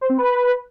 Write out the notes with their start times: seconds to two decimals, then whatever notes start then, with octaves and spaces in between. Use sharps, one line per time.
0.01 C5
0.09 C4
0.18 B4